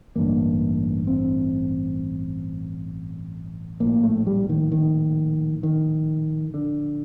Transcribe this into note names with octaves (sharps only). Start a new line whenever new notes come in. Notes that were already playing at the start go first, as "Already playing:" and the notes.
A1 G2 D3 A#3
C4
A#1 A2 A#3
A3
G3
D#3
D#3
D#3
D3